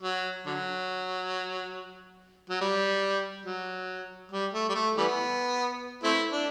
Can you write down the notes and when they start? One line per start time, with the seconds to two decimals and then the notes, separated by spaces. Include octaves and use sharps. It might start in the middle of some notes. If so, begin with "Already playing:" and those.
0.02 F#3
0.46 D3 F#3
2.50 F#3
2.61 G3
3.46 F#3
4.32 G3
4.53 A3
4.69 G3
4.75 A3
4.97 E3 G3 B3
6.04 A3 C4 E4
6.32 D4